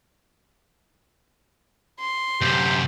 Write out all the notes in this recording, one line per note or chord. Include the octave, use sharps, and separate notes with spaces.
C6
F#2 C3 G4